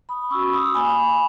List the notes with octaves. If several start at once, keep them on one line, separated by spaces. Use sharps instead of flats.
B5 D#6
C#4 F#4 C#6 E6
B5 D#6
A#3 G#5 B5